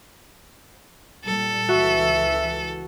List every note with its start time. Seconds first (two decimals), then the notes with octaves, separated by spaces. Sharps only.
1.24 A#2 G3 A4
1.69 C#2 E3 F#4 E5